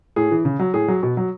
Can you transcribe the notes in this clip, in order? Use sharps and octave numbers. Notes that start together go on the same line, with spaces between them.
A2 G#4
E3
C#3
F#3
A2 G#4
F#3
B2
F#3